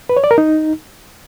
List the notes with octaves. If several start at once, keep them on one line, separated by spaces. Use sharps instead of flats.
B4
C#5
D5
A#4
D#4